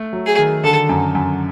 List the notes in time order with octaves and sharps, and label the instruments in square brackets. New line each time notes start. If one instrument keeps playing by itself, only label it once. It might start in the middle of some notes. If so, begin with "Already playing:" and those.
Already playing: [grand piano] A3
F#3
[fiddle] G#4
[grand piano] D#3
[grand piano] D3 [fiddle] A4
[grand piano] F#2
F#2